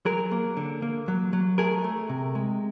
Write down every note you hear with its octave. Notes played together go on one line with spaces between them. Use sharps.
F#3 G#4 A#4
A#3
D3
A#3
F#3
F#3
A3 G#4 A#4
A3
C3
G#3